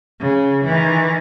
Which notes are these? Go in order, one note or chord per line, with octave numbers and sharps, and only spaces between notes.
C#3
D#3 E3